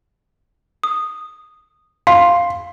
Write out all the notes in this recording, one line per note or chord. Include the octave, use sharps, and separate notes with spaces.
D#6
F5 C6